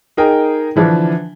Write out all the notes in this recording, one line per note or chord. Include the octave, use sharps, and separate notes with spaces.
D#4 G#4 A#4 G5
D3 E3 F3 D4